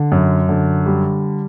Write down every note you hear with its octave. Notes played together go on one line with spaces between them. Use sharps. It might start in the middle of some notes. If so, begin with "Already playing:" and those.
Already playing: D3
F#2
D3
G3